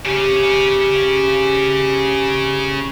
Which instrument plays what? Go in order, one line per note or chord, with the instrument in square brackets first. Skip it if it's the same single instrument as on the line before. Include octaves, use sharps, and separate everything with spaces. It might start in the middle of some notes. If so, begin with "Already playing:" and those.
[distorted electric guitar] C#3 C#4 [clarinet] G4